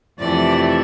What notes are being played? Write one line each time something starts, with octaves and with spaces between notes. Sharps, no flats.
F2 C3 E3 A3 D5